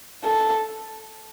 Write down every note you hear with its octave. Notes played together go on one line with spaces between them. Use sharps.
A4